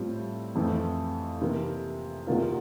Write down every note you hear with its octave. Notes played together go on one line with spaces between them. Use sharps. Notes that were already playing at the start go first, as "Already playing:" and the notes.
Already playing: A2 G3 C4 F4
F2 E3 A3 C4
C3 E3 A#3
E2 C3 E3 A#3 F4